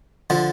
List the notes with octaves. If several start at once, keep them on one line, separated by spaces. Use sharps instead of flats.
D3 F3